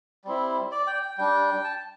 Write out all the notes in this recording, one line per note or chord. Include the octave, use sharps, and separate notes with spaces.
G3 C4 E4
D5
G5
G5
G3 D4 G5
A5